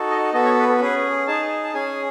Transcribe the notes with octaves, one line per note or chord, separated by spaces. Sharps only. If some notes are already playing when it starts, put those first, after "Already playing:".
Already playing: D#4 F#4 A4
D#5
B3 F#4 A4 D#5
C#5
B4
A4
C#4 G#4 B4
D#4 G#4 A5
A5
C#4 G#4 G#5